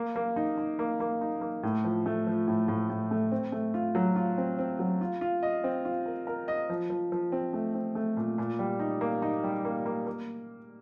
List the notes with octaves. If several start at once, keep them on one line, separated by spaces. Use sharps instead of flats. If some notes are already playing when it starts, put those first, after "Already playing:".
Already playing: A#3
A#3
D#4
D#4
A#3
A#3
D#4
A#3
A2
F3
A3
F3
A2
A2
A2
A3
C4
A3
F4
F#3
F4
C4
C4
F#3
F4
F4
D#5
C4
F4
A#4
A#4
D#5
F3
F3
F3
C4
A3
C4
A3
A#2
A#2
G3
D#4
A#3
D#4
G3
A#3
A#3
A#3